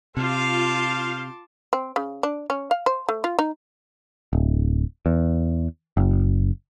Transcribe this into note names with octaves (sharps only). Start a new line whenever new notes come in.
C3 F4 C5 F5 A5 C6 D6
C4
C#3
D4
C#4
F5
C5
A3
F4
D#4
D1
E2
F#1